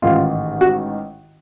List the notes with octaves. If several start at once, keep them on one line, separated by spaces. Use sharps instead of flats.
A1 G#2 D#3 F4
F#4